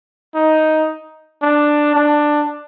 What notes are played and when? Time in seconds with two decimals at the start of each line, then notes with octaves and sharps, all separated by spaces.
0.35 D#4
1.42 D4
1.95 D4